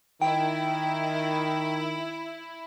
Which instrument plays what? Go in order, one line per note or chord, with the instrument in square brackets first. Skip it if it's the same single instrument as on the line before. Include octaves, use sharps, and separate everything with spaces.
[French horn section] D#3 [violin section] E4 [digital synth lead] G5